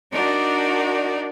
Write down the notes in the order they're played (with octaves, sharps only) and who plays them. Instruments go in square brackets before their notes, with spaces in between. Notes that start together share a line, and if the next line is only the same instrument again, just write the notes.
[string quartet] D4 D#4 F#4 A#4 D5